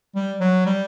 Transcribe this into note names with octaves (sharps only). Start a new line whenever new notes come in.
G3
F#3
G3